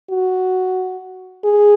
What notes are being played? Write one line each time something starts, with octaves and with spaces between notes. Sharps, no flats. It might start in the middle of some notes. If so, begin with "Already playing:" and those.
F#4
G#4